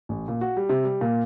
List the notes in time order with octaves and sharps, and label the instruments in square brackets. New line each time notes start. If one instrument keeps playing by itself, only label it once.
[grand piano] A1
A#2
F#4
G3
C3
G3
A#2